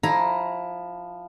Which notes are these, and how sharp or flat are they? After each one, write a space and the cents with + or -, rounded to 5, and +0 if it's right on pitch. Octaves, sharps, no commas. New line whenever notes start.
F3 +15 E4 +0 A#5 +10